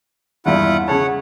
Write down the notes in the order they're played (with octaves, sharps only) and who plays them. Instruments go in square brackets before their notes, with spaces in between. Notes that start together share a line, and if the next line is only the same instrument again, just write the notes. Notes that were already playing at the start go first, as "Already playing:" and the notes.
[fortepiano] E2 G2 A#2 [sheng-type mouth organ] E4 F4 F#5
[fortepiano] C#3 G#4 A5 [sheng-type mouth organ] C#5 F#5